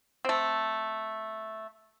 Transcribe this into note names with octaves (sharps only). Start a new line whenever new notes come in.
A3 C4